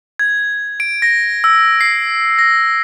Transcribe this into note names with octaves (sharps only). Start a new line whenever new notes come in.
G#6
D7
A#6
E6
C7
A#6